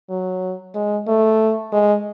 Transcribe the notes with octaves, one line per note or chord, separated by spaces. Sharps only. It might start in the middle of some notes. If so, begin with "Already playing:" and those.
F#3
G#3
A3
G#3